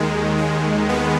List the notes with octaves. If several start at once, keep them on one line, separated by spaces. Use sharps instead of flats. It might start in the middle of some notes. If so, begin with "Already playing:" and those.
Already playing: D#2 D#3 G#3
G#3
B3